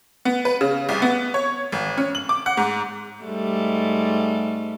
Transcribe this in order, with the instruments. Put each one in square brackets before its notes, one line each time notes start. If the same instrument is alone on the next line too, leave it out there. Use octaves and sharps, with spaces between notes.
[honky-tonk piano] B3
B4
C#3
C2
B3
C#5
G#1
C#4
F#7
D6
F#5
G#2
[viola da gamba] G#2 G3 A3